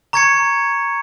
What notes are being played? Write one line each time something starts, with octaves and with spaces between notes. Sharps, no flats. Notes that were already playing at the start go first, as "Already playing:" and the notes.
A#5 C#6 G#6 C#7